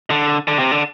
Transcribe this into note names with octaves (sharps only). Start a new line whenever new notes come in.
D3
D3
C3
D3